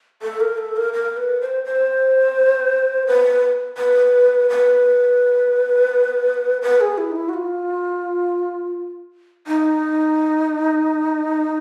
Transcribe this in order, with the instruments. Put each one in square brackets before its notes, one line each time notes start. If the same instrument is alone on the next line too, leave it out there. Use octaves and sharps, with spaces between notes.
[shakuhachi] A4
A#4
A4
A#4
A#4
B4
C5
C5
B4
B4
B4
B4
G#4
E4
D#4
E4
F#4
F4
D#4